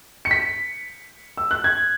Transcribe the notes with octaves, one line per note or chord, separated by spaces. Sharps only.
C#7
B6
E6
F#6
G#6